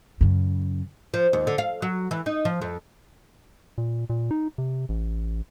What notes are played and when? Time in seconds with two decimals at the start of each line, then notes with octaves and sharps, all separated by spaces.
0.21 F#2 C#3
1.14 F3
1.33 D#2
1.47 D3
1.58 F5
1.82 F#3
2.11 E3
2.26 D#4
2.45 F3
2.62 F2
3.78 A#2
4.10 A#2
4.31 D#4
4.58 C3
4.89 A1